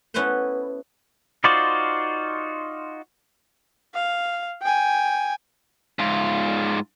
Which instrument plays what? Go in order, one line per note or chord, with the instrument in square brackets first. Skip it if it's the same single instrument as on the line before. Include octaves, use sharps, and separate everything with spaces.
[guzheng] B3 C#4 E4 A4 B4 C5
[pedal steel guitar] D#4 F4 F#4 C5 D5
[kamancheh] F5
G5 G#5
[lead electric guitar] G#2 F4